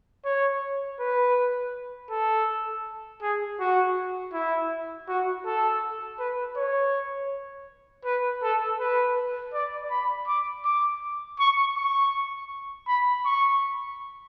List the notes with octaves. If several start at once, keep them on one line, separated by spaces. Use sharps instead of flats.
C#5
B4
A4
G#4
F#4
E4
F#4
A4
B4
C#5
B4
A4
B4
D5
B5
D6
D6
C#6
C#6
B5
C#6